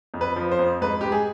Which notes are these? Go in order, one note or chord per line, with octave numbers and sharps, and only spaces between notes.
F2
B4
F3
C5
F2
G#2 B4
G#2 G4
G#4